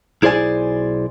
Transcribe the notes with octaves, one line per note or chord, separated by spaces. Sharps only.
B1 E4 G#4 C5 D5 G#5